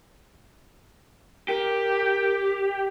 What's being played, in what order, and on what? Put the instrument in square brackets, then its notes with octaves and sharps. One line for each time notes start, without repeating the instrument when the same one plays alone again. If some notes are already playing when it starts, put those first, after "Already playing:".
[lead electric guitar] G4 [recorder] A#4